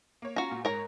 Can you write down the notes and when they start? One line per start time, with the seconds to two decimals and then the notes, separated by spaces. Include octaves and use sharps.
0.22 A#3 C#5
0.36 C#4 F4 F#4 A#5
0.51 A#2
0.65 G#2 A#4 C#5 A#5